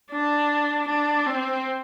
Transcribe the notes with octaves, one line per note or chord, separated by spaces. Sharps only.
D4
D4
C4